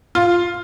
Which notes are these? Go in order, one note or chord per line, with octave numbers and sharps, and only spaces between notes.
F4